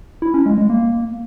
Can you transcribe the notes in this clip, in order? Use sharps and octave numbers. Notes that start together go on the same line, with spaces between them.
E4
C#4
G#3
G#3
A#3